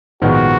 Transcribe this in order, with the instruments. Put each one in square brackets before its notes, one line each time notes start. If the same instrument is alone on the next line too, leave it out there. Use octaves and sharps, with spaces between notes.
[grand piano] A#1 G#2 D#3 G#3 B3 [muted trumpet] F#4